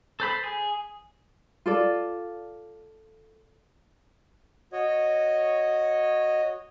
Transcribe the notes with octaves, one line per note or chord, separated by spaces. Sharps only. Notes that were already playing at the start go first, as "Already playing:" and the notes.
A4 C5 B5
G#4
F4 A4 D5
F#4 C#5 D#5